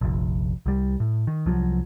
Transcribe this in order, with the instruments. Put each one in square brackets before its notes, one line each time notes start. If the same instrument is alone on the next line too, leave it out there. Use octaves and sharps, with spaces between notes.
[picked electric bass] F1 A#1
C2 G3
A2
D#3
C2 F3 F#3